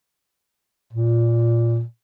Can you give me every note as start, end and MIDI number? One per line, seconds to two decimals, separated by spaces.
0.93 1.82 46